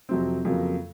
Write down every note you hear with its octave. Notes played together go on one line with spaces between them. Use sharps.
F2 C3 F#3 C4
F2 C#3 F#3 A#3